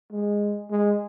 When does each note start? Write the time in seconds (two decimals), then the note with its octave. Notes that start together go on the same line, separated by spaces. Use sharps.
0.12 G#3
0.71 G#3